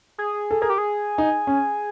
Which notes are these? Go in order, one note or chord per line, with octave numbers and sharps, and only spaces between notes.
G#4
A4
G#4 A#4
G4
G#4
D#4
C#4